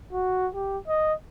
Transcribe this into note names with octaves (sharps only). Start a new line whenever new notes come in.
F#4
G4
D#5